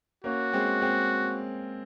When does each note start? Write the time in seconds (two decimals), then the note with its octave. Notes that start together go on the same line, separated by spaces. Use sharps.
0.24 A#3 C#4 F#4
0.53 G#3 C4
0.82 G#3 C4